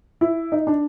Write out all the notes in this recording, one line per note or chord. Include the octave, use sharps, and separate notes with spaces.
E4
D#4
D4